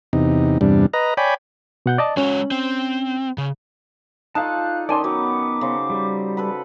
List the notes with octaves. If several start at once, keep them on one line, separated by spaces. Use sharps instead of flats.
E2 C3 D#4
E2 G2 C3 G3 D4
B4 D#5 A#5
C#5 D5 G5 G#5 B5
B2 F#5 G6
D5 D#5 A5
G#3 C#4 F#4 C#5
C4
C#3
D#4 F4 A4 D5 F5 A5 F#6
D#3 C#4 D5 G#5 A5 C6
F#3 B3 D6
C#3 C5
G3
A4 B4 B5